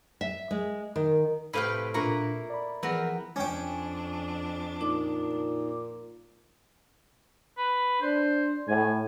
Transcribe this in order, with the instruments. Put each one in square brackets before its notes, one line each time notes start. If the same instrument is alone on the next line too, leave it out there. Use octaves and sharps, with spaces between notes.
[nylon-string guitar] E5
G#3
D#3
[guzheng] A2 C3 [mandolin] B4 F5 G5
[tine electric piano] A#2 D4 F4 [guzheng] A#3 E4 B4 [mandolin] A#5 C#6
[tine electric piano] D5 B5
[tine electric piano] E3 F3 G#4 [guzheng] B3 [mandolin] C4 A#4
[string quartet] F2 D4 [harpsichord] C#4 G5
[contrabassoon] A#2 [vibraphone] D#4 D6
[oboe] B4
[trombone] D4 [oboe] C5
[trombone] A2 [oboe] G#5